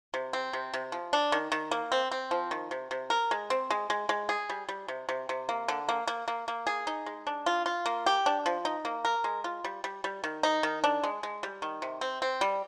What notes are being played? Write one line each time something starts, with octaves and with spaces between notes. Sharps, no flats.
C3
C4
C3
C3
F3
D4
D#3
D#3
A#3
C4
C4
F3
D#3
C3
C3
A#4
G#3
C4
G#3
G#3
G#3
G#4
G3
G3
C3
C3
C3
A#3
D3
A#3
A#3
A#3
A#3
G#4
D#4
G#3
D4
F4
F4
A#3
G4
D4
F3
D#4
A#3
A#4
G#3
F4
G3
G3
G3
D#3
D#4
D#3
D4
G#3
G#3
G3
D#3
C3
C4
C4
G3